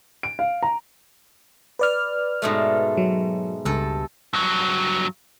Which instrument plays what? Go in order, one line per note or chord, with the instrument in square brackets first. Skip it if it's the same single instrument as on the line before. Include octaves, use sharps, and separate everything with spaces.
[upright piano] D7
F5
A#5
[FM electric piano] B4 D5 F6
[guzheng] G#2 B2 A3
[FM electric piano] F#3
[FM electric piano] C#2 [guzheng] G2 A4
[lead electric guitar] G2 F#3